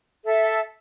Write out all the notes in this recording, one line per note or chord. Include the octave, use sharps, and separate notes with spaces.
A4 E5